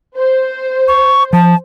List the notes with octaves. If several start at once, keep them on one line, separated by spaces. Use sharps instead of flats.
C5
C#6
F3 A5